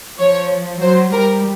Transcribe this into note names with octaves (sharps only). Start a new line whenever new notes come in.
F3 C#5
F#3 C5
G3 A#4